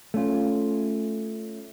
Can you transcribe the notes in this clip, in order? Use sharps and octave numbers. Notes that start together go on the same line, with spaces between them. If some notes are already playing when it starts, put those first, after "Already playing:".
A3 C#4 F4